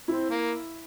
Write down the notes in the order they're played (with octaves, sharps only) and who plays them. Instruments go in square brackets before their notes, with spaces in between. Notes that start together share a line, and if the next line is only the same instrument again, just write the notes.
[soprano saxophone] C4 [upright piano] E4
[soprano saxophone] A#3